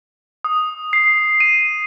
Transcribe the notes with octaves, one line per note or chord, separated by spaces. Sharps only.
D#6
C7
D#7